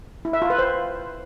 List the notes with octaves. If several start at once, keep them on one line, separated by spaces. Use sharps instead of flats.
E4
E5
F4
B4
C5